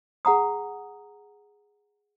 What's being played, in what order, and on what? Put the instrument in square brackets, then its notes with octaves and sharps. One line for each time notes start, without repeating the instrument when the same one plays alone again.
[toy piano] G#4 F#5 A#5 D#6